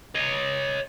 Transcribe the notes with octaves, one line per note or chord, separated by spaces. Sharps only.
C#5 D#5